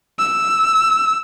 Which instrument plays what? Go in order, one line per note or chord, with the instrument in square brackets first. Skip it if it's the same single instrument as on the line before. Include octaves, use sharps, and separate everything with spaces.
[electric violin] E6